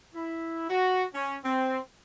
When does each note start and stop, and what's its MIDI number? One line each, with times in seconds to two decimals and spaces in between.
0.15 0.68 64
0.70 1.04 66
1.14 1.37 61
1.44 1.80 60